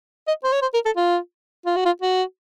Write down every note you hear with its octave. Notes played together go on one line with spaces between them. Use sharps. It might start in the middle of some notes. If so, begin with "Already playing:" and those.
D#5
C5
C#5
C5
A#4
A4
F4
F4
F#4
F4
F#4